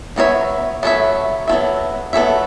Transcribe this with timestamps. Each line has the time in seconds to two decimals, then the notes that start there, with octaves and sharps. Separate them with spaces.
0.16 F#3 B3 A4 C#5 E5
0.83 F#3 B3 A4 C#5 E5
1.48 F#3 B3 A4 C#5 E5
2.13 F#3 B3 A4 C#5 E5